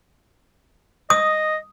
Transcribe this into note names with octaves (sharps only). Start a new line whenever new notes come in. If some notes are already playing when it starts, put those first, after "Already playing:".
D#5 D#6